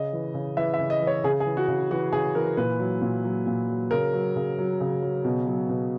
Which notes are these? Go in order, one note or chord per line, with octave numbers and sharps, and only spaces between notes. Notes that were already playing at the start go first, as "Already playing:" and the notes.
Already playing: C#3 D#5
E3
C#3
E3 E5
E5
C#3
D#5
E3
C#5
C#3 G#4
G#4
E3
F#4
C#3
E3 F#4
C#3 G#4
E3 A#4
A#2 B4
F#3
A#2
F#3
A#2
F#3
C#3 A#4
F#3
C#3
F#3
C#3
F#3
B2
F#3
B2